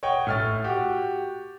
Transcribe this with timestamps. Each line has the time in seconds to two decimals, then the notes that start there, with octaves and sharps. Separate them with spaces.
0.03 C#5 D#5 F#5 G5
0.27 A2 F6 A6
0.64 F#4 G4